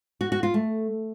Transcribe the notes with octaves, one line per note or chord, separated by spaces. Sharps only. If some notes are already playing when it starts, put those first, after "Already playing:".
F#4
F#4
F4
A3